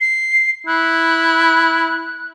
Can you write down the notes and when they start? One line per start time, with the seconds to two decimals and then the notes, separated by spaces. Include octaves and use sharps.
0.01 C7
0.67 E4 F#6